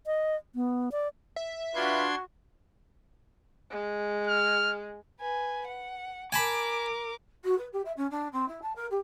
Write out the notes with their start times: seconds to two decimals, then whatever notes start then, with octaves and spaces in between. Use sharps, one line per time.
0.06 D#5
0.55 B3
0.92 D5
1.36 E5
1.75 D4 F4 F#4 B4 C6 G#6
3.70 G#3
4.27 F6
5.21 B4 G#5
5.67 F#5
6.32 A#4 G#5 A5 B5 D6
7.44 F#4
7.58 B4
7.72 G4
7.85 E5
7.96 C#4
8.10 D4
8.32 C4
8.48 E4
8.61 A5
8.75 A#4
8.90 G4